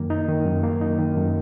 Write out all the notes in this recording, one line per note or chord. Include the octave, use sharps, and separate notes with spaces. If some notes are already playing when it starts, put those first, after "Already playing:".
Already playing: F#2 D#3 A#3
D#4
D#3
F#2
A#3
D#4
D#3
F#2